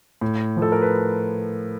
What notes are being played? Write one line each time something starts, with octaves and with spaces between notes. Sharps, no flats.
A2
F3
A4
A#4
B4